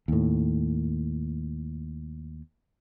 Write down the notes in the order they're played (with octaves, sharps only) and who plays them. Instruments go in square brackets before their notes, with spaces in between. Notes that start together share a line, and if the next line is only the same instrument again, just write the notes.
[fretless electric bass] D#2 A2